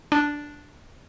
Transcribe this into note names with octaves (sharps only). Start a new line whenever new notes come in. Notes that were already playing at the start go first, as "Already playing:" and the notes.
D4